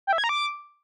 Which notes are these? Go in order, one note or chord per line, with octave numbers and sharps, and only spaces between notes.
G5
E5
G#6
A#5
D6